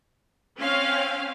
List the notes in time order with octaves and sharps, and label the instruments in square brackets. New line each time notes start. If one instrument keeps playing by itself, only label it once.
[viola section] C4 C#4 F5